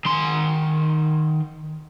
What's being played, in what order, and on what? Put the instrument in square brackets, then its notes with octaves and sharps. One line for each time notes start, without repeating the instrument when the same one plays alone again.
[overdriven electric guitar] D#3 C6